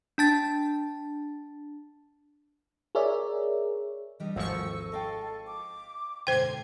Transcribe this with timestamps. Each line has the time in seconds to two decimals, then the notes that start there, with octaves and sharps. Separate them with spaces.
0.18 D4 A5 A6
2.95 G#4 A#4 C#5 D5 E5
4.20 E3 G3 D4 D#5
4.36 G#1 D#2 F3 D#4 A4 C#6 E6
4.92 A4 D#5 F5 G5
5.47 D6
6.27 G#2 B2 D3 C5 G5 C6 G#6